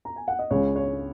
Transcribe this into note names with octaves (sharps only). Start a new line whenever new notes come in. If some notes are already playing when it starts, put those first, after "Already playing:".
A#5
G#5
F#5
D#5
C#2 C#3 C#5
C#5